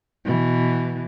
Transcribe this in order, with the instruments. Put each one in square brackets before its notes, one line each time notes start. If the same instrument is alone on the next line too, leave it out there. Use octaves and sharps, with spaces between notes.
[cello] B2 E3